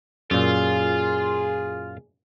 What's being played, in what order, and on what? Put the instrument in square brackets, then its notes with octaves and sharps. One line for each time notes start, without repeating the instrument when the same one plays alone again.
[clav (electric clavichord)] F#2 A#2 [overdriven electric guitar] F4 [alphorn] G#4